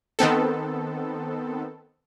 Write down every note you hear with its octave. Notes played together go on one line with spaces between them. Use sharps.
D#3 B3 C4 A4